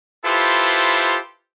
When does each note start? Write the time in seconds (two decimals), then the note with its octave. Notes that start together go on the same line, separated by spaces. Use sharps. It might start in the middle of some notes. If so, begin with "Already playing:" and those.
0.24 E4 F4 G4 A4 B4 C5